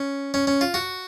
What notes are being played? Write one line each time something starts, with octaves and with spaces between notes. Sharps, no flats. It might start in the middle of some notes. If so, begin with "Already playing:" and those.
Already playing: C#4
C#4
C#4
F4
F#4